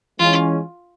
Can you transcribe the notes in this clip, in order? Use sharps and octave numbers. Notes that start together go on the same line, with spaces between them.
E3 G#3 C#4 F4